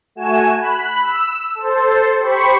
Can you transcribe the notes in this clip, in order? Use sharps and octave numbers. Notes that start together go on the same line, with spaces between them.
A3 F#4 G#5 E7
B5 F#6
E6
A4 C5
G4 C5 B5 C#6